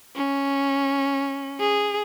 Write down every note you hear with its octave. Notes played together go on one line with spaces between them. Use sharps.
C#4
G#4